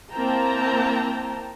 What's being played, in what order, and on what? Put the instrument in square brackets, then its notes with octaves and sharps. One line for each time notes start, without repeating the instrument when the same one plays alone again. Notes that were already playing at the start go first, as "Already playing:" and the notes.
[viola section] A#3 C4 E4 G5 A5 A#5